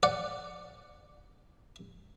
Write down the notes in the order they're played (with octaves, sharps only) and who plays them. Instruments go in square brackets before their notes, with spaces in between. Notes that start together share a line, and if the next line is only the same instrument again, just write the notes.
[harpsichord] D5 F#5